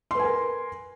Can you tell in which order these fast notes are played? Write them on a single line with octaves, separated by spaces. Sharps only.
C6 B4 G#5 A#4